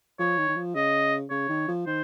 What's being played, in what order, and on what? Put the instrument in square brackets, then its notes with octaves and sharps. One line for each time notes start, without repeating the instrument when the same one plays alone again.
[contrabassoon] F3 [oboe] C#5
[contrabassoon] D#3
D#3
F3
[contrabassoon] C#3 [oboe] D#5
[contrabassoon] C#3 [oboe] C#5
[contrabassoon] D#3
F3
[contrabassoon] D#3 [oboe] C5